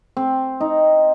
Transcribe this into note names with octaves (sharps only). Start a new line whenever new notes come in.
C4
D#4